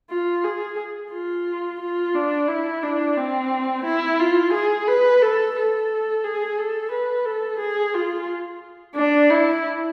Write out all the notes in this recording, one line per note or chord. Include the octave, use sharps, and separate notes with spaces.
F4
G#4
F4
F4
D4
E4
D4
C4
E4
F4
G#4
B4
A4
A4
G#4
A4
B4
A4
G#4
F4
D4
E4